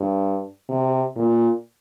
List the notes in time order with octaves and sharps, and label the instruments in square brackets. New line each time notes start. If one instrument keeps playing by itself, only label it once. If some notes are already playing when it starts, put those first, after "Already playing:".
Already playing: [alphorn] G2
C3
A#2